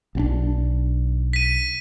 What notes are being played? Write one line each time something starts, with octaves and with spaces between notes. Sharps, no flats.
B1 C4 D4
B6 D#7